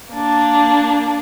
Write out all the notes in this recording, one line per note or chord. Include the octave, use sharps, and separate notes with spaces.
A#3 D4